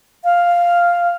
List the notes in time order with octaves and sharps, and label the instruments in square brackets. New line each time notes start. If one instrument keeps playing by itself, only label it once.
[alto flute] F5